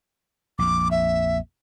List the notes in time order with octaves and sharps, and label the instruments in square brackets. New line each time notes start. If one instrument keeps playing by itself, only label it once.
[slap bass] A#1 F2 [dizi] D6
[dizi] E5